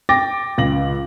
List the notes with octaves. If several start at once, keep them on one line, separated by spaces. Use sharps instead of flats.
G5 D6 A6 A#6
C#2 A#6 F#7